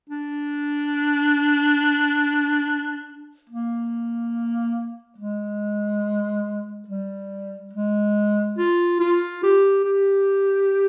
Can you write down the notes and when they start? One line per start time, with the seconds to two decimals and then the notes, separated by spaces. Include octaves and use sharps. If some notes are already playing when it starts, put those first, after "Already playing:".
0.10 D4
3.49 A#3
5.18 G#3
6.88 G3
7.73 G#3
8.58 F4
9.00 F4
9.43 G4
9.85 G4